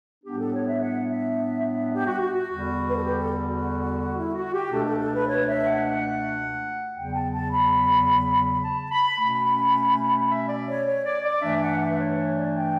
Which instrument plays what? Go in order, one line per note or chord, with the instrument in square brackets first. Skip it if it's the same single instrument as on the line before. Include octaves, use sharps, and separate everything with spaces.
[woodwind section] A2 G3 B3 D4 G4
A4
C#5
E5
F#5
E5
G4
F#4
F#4
F#4
E2 D3 G3
B4
A4
G4
A4
F#4
E4
F#4
G4
C#2 B2 A3 D4 A4
A4
A4
B4
C#5
E5
F#5
E2 C#3 F#3 G5
A5
A5
B5
A5
B5
B2 A3 C#4 B5
E5
D5
C#5
C#5
D5
D5
G2 E3 A3 D4 E5
F#5
E5
B4
C#5
C#5
D5
G5